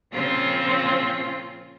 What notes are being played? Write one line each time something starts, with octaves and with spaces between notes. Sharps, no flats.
A#2 C#3 F3 C4 C#4 F4